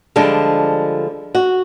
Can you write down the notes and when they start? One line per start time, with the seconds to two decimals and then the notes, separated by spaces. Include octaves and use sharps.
0.16 D3 F3 G3 G#3 D4
1.35 F#4